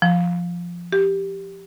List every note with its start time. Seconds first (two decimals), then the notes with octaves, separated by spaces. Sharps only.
0.02 F3
0.93 G4